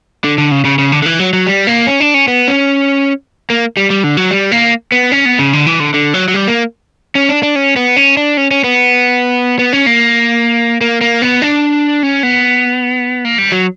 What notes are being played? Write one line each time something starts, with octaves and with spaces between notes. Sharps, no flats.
D3
D3
C#3
C#3
C#3
D3
D3
E3
F#3
F#3
G3
A#3
C#4
D4
C#4
B3
C#4
A#3
G3
G3
D3
F#3
G3
A#3
B3
C#4
B3
C#3
D3
E3
D3
D3
F#3
F#3
G3
A#3
C#4
D4
D4
C#4
B3
C#4
D4
C#4
C#4
B3
B3
C#4
A#3
A#3
A#3
B3
D4
C#4
B3
A#3
G3
F#3